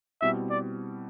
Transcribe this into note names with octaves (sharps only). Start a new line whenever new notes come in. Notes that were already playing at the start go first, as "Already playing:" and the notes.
B2 G3 C4 E4 E5
D5